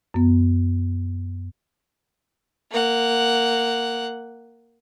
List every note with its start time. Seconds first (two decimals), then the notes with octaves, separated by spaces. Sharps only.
0.14 F#2 B3
2.71 A#3 F#5